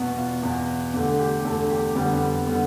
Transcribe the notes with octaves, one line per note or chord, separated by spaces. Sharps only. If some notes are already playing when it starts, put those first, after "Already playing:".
Already playing: E2 B2 B3
F4
E2 B2 B3
E2 D3 A3 G4
G4
E2 D3 A3 A4
G4
F2 D3 G3 B3 G4
D3 G3 B3